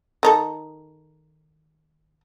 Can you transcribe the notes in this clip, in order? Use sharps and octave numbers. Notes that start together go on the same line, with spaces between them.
D#3 D#4 A4